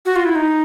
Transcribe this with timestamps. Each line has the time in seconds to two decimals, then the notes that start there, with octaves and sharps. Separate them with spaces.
0.06 F#4
0.16 F4
0.25 E4
0.35 D#4